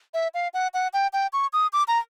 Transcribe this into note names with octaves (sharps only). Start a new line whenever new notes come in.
E5
F5
F#5
F#5
G5
G5
C#6
D#6
D6
A#5